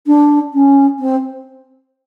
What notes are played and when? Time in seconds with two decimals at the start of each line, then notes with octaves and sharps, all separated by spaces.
0.06 D4
0.53 C#4
0.99 C4